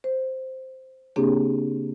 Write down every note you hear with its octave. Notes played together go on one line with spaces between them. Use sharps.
C5
C#3 A#3 C4 D4 G4 G#4